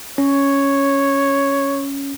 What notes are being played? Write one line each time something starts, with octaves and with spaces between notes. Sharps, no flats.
C#4 C#5